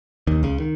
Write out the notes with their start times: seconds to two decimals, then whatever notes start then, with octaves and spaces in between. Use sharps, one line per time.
0.27 D#2 D#3
0.43 C#2 C#3
0.60 D#3